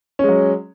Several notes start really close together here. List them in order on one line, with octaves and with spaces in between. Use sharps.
C#4 G#3 F#3